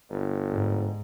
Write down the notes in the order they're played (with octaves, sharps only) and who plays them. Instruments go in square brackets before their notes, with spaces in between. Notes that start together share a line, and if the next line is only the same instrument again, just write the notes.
[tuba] G1
[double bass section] G#2